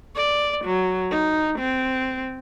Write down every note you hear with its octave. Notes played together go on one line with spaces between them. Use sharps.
D5
F#3
D#4
C4